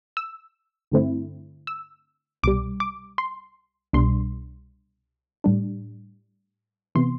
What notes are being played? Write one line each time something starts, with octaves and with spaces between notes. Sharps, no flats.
E6
G2 D3 A3 C4 E4
E6
C2 B2 G3 D6
D6
C6
C2 B2 G3 D4 C6
A2 G3 D4
C3 E3 B3 C6